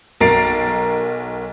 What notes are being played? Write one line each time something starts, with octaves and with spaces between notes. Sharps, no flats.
B1 A#4 A#5 A6 C7 D7